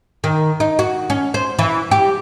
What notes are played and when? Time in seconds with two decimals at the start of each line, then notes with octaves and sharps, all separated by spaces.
0.24 D#3
0.60 D#4
0.79 F#4
1.10 C#4
1.34 C5
1.59 E3
1.91 G4